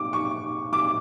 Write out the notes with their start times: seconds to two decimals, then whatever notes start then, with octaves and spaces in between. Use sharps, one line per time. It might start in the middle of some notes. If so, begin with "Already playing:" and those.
Already playing: D6
0.13 C#6
0.73 D6